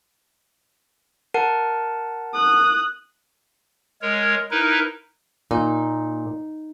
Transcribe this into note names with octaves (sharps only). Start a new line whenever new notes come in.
A#4 F#5 A5
D#6 F#6
G#3 A#4 C#5
D#4 E4 A#4 B4
A#2 D#4